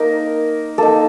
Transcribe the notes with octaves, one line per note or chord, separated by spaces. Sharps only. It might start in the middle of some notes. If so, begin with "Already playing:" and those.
Already playing: A#3 D#4 A#4
A#3 D#4 A4